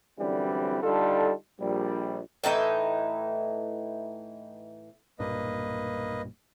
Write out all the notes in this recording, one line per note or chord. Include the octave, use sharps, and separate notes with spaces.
A1 F#2 D3 E3 G3 C4
D3 G3 D#4 F4 A4
A#1 G3
A2 E3 D#4 E5
B1 G2 A#2 A#3 B4 D#5